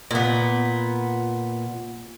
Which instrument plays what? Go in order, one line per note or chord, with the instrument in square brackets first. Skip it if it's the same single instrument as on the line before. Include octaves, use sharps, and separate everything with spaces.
[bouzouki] A#2 B3